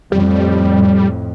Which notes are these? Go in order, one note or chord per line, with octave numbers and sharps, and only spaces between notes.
F2 A2 G3